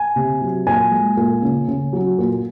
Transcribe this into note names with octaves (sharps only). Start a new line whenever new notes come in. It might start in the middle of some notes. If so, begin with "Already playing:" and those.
Already playing: G#5
C3
F#3
A#2 G#5
G#3
A#2
C#3
C#3
F#3
A#2